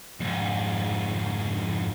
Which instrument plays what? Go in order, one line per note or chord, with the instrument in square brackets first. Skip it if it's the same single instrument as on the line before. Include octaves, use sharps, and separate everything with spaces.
[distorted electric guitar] F2 G#2